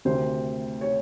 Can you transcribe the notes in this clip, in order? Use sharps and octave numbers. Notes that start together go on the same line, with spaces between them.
D2 C3 D#3 C5
C#5